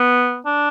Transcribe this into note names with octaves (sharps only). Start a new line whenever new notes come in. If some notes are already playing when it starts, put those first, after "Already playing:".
Already playing: B3
D4